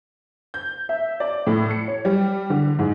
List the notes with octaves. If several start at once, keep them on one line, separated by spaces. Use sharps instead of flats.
G6
E5
D5
A2
C#7
C#5
G3
D3
G#2